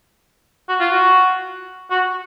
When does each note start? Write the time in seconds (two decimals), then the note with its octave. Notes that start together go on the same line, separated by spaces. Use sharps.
0.69 F#4
0.80 F4
0.91 F#4
1.91 F#4